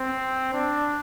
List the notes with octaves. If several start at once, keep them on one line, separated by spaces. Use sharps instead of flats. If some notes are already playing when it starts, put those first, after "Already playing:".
Already playing: C4
D4